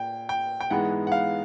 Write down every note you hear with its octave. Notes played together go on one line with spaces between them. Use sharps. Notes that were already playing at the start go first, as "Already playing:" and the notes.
Already playing: A#2 G5
G5
G5
G#2 E3 G#3 B3 F#5
F#5
F5